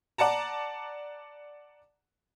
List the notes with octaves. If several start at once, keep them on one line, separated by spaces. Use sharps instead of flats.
D5 F#5 A5 A#5